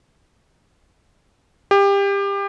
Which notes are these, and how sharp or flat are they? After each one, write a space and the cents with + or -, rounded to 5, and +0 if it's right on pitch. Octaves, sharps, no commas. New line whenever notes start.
G4 +25